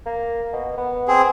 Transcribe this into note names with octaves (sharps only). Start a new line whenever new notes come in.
A#3
B2
B3
C4 G#4